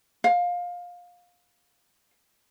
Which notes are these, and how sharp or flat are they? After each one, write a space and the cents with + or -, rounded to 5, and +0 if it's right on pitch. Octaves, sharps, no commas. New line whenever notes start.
F5 +20